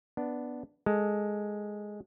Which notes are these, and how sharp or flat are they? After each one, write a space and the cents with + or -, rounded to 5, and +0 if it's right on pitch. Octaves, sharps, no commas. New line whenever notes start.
B3 +0 D4 +0
G#3 +0 A4 +0